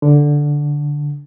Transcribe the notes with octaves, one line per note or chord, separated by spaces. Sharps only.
D3